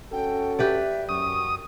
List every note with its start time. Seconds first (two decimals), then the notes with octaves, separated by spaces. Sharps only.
0.12 C#4 F#4 A4 G5
0.59 G4 B4 D5 E5
1.09 F#2 C#6 D#6